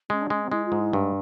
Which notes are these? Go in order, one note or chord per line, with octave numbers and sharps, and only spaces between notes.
G#3 C#4
D4
G#3 C#4
C4
G#3 E4
F4
G#2
E4
G2 D4